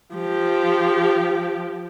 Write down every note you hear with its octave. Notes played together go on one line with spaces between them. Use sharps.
F3 G4